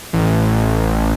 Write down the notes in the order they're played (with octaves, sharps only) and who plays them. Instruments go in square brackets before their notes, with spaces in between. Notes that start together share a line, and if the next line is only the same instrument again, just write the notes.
[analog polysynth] A1